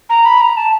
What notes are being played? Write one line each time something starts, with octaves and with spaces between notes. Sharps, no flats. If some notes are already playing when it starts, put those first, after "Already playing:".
A#5
B5
A#5
A5